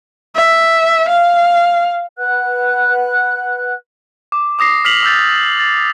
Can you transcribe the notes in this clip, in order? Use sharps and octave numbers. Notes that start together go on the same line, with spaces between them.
E5
F5
B4 F#5 F#6
D6
D6 D#6 A#6 C7
F6 B6 C7 F7 F#7
D6 E6 G6 A6
A6